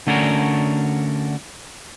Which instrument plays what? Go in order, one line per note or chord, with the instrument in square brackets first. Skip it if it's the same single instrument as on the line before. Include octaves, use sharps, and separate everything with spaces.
[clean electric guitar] D3 A3 C#4 D4 F#4 A#4